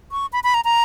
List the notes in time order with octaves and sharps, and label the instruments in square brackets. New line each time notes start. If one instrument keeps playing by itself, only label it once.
[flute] C#6
B5
B5
A#5
A#5